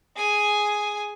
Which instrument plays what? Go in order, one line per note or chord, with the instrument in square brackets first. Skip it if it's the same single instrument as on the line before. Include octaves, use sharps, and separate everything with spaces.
[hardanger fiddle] G#4 G#5